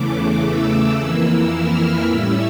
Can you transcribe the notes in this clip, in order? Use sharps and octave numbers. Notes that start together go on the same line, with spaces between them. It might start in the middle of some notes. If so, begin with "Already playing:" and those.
Already playing: E2 C#3 E3 A3 D6
E6
F2 E3 A#3 E4
F6
A2 G3 C#4 E4 E6